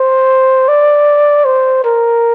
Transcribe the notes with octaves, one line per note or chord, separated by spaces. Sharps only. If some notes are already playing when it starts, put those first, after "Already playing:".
Already playing: C5
D5
C5
A#4